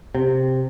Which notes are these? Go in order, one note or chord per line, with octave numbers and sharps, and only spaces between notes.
C3